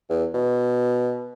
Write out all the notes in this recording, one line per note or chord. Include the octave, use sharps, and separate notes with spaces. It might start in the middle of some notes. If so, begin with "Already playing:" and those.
E2
B2